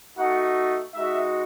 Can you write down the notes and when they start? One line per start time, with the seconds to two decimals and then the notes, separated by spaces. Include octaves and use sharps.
0.17 A3 D#4 F#4 F#5
0.94 G#3 D#4 F#4 E5